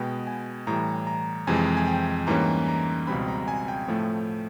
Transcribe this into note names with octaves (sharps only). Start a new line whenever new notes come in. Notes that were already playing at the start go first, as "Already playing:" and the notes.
Already playing: B2 G#3 B3 G5
G#5
A2 E3 G3 A#5
A#5
F2 C3 E3 G#3 G#5
G#5
G5
G#2 E3 G3 A#3 C#4 A#5
A#5
C#2 B2 G3 C4 B5
A#5
G#5
G5
A2 F3 A3